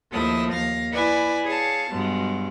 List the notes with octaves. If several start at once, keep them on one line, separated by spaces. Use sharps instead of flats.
D#2 F3 A3 E4 D#6
D#2 F5 A#6
E4 B4 D5 G#5
G#4 C#5 F5 A5
G2 B2 F#3 G#3